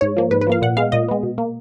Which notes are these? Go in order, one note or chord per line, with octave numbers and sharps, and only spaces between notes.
G#2 C#5
F3 A#3
G#2 B4
B4
F3 A#3 F5
A#2 F#5
G#3 B3 F5
A#2 D#5
G#3 B3
B2
A#3